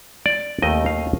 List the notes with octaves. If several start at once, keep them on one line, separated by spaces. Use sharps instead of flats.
D5
D#2 D#3 A3 D#4 D#5
F5